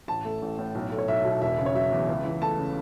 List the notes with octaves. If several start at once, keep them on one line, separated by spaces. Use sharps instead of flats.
A1 A5
A3
A1
A2
B1
A3
C#5
B1 E5
B2
E1 E5
C#3
C#5
F#3 E5
E2
C#2
E3
A3 A5
C#3